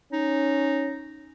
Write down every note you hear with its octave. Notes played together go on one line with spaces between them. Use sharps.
C#4 D#4